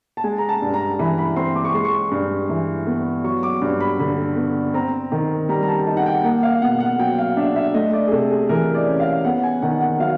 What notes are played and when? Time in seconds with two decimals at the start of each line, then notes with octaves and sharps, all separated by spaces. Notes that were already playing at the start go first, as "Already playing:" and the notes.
0.17 A5
0.24 G#3 G#5
0.38 A#5
0.49 A5
0.62 G2
0.74 A#5
0.99 E3 B5
1.18 B5
1.36 C4 C6
1.55 D6
1.65 C#6
1.74 G#3 C6
1.85 C#6
2.11 G2
2.49 E3
2.87 B3
3.24 F#3 C#6
3.43 D6
3.62 G2
3.80 B5
3.99 D3 B5
4.36 B3
4.74 C4 A#5
5.12 D#3
5.49 G3 A#5
5.63 A#5
5.68 A5
5.87 D#4 A5
5.97 F#5
6.06 G5
6.24 A#3 F#5
6.43 F5
6.61 B2 F#5
6.80 F#5
7.00 F#3 G5
7.18 F5
7.37 D4 E5
7.56 E5
7.74 A3 D#5
7.93 D5
8.08 G#4
8.12 C3 A4
8.31 G#4
8.49 E3 A#4
8.75 D5
8.87 C#4
9.00 F5
9.25 B3 F#5
9.43 G#5
9.62 D#3 F#5
9.81 F#5
10.00 F#3 F5